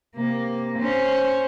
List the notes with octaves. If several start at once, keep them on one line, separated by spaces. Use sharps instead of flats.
C3 A#3
C#4 C5